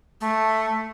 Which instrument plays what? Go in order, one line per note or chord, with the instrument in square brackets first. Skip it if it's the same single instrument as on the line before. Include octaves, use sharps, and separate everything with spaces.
[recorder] A3